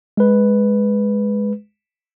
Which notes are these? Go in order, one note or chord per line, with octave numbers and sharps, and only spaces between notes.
G#3 B4